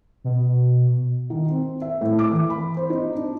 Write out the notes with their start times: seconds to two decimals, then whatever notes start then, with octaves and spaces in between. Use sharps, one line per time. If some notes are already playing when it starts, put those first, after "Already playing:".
0.24 B2
1.30 D#3
1.49 C4
1.81 E5
2.01 A2
2.19 D6
2.31 E3
2.50 B5
2.77 C5
2.90 D#4
3.15 D4